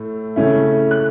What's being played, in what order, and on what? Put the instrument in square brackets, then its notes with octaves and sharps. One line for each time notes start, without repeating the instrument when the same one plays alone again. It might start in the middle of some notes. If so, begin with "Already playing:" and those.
Already playing: [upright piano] A2 A3
C#3 A3 C#4 E4
F#6